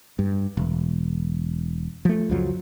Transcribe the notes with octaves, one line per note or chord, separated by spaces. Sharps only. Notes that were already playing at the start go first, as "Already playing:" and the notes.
G2
E1
F3 A3
C#2 F#2 F3 F#3